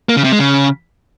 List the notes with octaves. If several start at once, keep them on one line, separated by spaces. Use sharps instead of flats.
A#3
C#3
C3
G#3
C#3